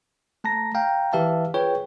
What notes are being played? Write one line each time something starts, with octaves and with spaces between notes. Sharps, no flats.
A3 A5 A#5 A#6
F5 G5 A#5
E3 G4 B4 E5 F5 A5
F4 G#4 B4 C#5 G5